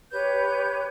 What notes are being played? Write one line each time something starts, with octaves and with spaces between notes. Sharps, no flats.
G4 B4 C#5 G6